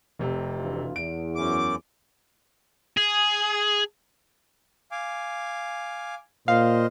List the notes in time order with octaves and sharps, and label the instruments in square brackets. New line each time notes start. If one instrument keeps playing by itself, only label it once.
[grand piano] F1 C3
[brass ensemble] D2 E3 F4
[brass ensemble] E2 [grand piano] D7
[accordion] F#2 D6
[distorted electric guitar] G#4
[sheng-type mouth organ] F5 G#5 D6
[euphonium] A#2 [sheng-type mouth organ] C5 D#5 [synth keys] F5